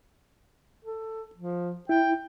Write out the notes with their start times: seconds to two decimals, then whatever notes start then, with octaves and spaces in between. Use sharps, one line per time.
0.85 A4
1.35 F3
1.89 E4 G5